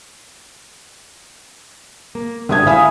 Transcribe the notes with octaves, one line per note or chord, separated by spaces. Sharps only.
A#3
G#1 D3 G4 D#6 G#6
E4 E5 F5 G#5 B5 D#6